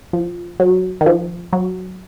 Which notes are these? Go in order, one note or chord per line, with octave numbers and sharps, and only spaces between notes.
F3
F#3
D#3
F3
F#3